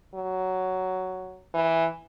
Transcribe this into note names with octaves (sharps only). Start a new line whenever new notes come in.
F#3
E3